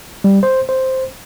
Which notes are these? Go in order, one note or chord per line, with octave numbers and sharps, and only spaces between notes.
G3
C5
C5